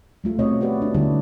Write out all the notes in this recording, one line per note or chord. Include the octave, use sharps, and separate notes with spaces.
G3 A3 F4
B2 C4 C#5 D#5
F#4 G4 B4 D5
D4 F#4
D3 G3 C#4 E4 G4